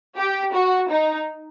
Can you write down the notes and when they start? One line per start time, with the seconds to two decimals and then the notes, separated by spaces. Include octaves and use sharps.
0.16 G4
0.53 F#4
0.89 D#4